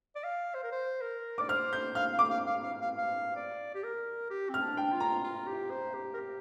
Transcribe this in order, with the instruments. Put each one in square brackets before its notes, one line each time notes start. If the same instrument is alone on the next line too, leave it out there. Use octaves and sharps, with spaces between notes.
[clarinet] D5
F5
C5
A#4
C5
A#4
[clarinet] D5 [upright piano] D6
[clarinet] C5 [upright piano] F6
[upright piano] G6
[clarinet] F5 [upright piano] F6
[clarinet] F5
[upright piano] D6
[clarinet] F5
F5
F5
F5
F5
D5
G4
A#4
G4
[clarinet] C4 [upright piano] F6
[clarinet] D4
[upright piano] G5
[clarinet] F4
[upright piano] A#5
[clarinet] F4
G4
C5
G4
A#4
G4